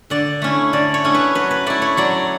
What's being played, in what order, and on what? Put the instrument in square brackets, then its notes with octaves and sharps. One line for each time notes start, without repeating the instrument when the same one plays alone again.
[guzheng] D3 D5
A3 C#4 E4
D3 D5
C#5
A3 C#4 E4
B4
F#3 B4
B4
A3 E4 D5
C#5
F#3 D5